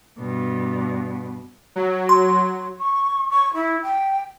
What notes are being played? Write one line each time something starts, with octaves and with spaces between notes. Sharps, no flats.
G2 B2
F#3
C6
C#6
C#6
E4
G5